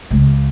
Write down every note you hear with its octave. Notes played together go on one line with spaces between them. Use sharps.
C#2